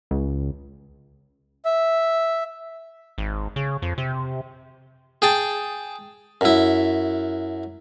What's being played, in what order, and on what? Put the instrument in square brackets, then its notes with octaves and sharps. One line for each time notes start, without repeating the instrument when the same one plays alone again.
[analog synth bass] C#2
[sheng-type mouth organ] E5
[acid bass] G#1
C#3
F2
C3
[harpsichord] G#4 G5 A5
F#2 E4